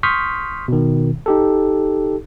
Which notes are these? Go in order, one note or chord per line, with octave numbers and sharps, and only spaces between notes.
C6 C#6 D#6 F6 G6 B6
B2 D#3
D#4 G4 A4